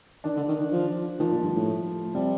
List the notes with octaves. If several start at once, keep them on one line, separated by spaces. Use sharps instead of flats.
D#3 D4
D3
D#3
D#3
F3
D#3 F3
A#2
G2
A2
C3 G3